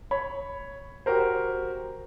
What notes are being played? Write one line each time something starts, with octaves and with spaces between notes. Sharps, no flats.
C#5 B5
F#4 G4 A#4 C5